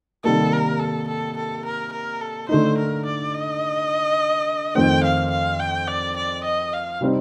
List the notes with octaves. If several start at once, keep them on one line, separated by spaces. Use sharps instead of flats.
C3 D#3 G3 A#3 A4
A#4
A4
A4
A4
A#4
A#4
A4
D3 A3 D#4 C5
A#4
D5
D#5
F2 D#3 A3 C4 G5
F5
F5
G5
D5
D5
D#5
F5
C3 G3 C4 D#4